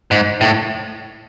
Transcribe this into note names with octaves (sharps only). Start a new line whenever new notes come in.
G#2
A2